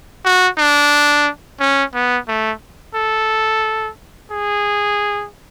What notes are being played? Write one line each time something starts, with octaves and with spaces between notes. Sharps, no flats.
F#4
D4
C#4
B3
A3
A4
G#4